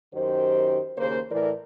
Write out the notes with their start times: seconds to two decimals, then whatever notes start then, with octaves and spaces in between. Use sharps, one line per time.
0.14 F#2 D#3 G4 C5
0.98 D#2 C#3 A#3 C5
1.31 A2 E3 A#4 B4 D5